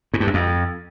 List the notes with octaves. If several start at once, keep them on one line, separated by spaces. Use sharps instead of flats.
G#2
G2
F#2
F2